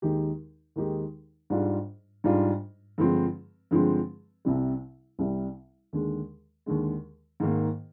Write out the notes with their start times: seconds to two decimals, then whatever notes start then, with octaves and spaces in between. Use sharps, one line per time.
0.02 D#2 D#3 G#3 D#4 G4
0.76 D#2 D#3 G#3 D#4 G4
1.50 G#2 G3 D4 F4
2.24 G#2 G3 D4 F4
2.98 G2 D3 F3 G#3 C4
3.71 G2 D3 F3 G#3 C4
4.45 C2 C3 G3
5.19 C2 C3 G3
5.93 D#2 D3 G#3
6.66 D#2 D3 G#3
7.40 G#2 D#3 A#3